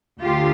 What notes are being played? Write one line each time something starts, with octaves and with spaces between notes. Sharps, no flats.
D2 D3 F4 G4